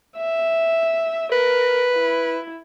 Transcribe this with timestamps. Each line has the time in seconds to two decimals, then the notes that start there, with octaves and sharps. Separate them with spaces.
0.17 E5
1.32 A#4 B4
1.97 E4